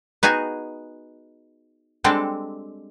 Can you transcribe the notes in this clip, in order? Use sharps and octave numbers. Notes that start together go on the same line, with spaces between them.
B3 D#4 F#4 G#4 G#5
G3 G#3 C4 D4 A4